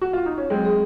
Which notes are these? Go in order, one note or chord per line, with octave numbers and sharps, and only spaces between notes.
F#4
F4
D#4
C#4
F#3 G#3 C4
G#4